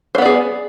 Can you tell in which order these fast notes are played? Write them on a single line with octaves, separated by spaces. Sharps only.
C5 B3 D5 G#4